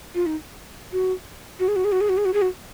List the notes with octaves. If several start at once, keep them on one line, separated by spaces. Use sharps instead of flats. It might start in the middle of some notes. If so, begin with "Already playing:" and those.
F4
D#4
F#4
F#4
G#4
F#4
G#4
F#4
G#4
F#4
G#4
F#4
G#4
F#4